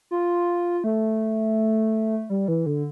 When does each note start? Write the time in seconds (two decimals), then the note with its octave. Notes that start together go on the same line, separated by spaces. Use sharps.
0.11 F4
0.84 A3
2.30 G3
2.48 E3
2.66 D3